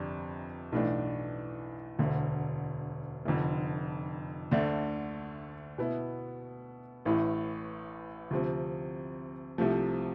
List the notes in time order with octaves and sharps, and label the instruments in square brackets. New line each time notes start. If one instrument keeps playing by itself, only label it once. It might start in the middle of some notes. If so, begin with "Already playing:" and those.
Already playing: [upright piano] G1 F2 C3 D4
B1 A2 E3 A3 D4
E1 D2 D3
F1 F2 D3
D2 D3 A3 D4
B2 B3 E4
A1 A2 E3
D2 C3 F3 C4
C2 C3 F3 A3